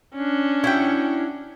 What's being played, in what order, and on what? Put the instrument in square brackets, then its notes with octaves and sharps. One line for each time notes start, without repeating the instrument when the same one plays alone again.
[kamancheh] C#4 D4
[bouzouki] E4 F#4 G5